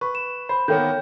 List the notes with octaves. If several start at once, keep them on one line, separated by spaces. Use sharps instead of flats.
B4 C#6
E7
C5 B5
D#3 A#3 B3 C#5 G5 G6